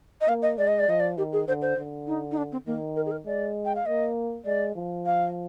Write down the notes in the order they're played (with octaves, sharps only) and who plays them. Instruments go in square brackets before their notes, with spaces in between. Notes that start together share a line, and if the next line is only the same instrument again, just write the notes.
[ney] D#5
[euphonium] A#3 [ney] F5
[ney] D#5
[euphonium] G#3 [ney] D5
[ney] D#5
D5
[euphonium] F3 [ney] D#5
[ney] D5
[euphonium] D#3 [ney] G4
[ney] G#4
[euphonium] D3 [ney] C5
[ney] C5
[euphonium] D3
[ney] D#4
D#4
D4
C4
[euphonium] D#3 [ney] A#3
[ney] A#4
G#4
A#4
[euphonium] G#3 [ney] D5
[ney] G5
F5
[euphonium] A#3 [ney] D#5
[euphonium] G#3 [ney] D5
[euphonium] F3
[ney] F5